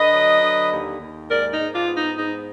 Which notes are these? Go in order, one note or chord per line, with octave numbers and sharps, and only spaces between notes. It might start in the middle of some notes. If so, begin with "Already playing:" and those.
Already playing: D3 B4 D#5
F#3
D3
D#2
D#2
G#2 A#4 D5
D#4
G#2
D4 F4
B3
D#4
G#2 D#4